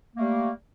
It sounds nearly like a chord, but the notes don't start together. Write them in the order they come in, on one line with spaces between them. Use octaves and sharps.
A#3 A3 G3